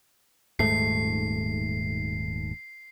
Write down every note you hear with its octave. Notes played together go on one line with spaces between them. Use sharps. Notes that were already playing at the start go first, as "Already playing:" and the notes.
D#1 G#2 A3 C7